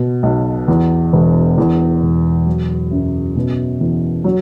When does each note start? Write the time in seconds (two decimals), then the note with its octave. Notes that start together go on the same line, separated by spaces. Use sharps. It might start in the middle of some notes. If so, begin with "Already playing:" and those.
Already playing: B2
0.23 B1
0.68 E2
1.13 E1
1.58 E2
2.02 E1
2.46 F#3
2.91 F#2
3.36 B2
3.81 E2
4.24 F#3